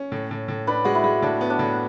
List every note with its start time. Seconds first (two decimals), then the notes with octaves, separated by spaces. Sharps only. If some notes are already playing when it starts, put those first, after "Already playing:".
Already playing: C#4
0.12 A2
0.31 A2
0.48 A2
0.67 D4 B4
0.84 G#3 F#4
0.95 E4
1.04 G#3
1.22 A2 D4
1.41 B3
1.50 D4
1.59 A2